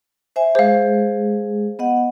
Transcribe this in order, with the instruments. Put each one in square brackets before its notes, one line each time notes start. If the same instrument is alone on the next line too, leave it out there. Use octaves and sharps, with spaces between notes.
[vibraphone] C5 E5 G#5
[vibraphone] G#3 G#4 [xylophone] C5 F5
[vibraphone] B3 D#5 F#5